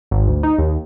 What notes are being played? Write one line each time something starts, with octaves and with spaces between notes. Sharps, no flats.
G#1
D2
D#4
D#2